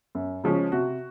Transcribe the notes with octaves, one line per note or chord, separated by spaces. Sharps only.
F#2
C#3 F3 G#3 C#4
C3 F#4